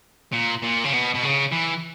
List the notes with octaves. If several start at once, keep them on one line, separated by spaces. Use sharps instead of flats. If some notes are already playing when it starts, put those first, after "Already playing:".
A#2
A#2
C#3
B2
B2
C#3
E3